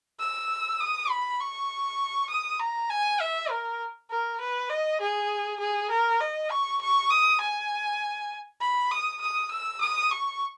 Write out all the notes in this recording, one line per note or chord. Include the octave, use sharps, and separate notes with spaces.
E6
D#6
B5
C#6
D#6
A#5
G#5
E5
A#4
A#4
B4
D#5
G#4
G#4
A#4
D#5
C#6
C#6
D#6
G#5
B5
D#6
D#6
E6
D#6
C#6